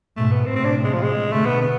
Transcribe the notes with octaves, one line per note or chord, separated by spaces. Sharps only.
G#2 B2 A3
B3
A2 C3 C4
C4
D4
G#3
F3
G#3
B2 D3 A3
B3
B3